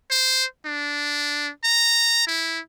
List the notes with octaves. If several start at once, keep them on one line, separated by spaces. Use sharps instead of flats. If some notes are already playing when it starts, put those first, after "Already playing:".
C5
D4
A#5
E4